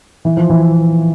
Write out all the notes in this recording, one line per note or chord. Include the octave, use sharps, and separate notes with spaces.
E3
F3
E3